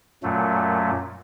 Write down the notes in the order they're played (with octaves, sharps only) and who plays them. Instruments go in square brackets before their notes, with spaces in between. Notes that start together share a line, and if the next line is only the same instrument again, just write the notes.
[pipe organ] F#2 A#2 F#3 A3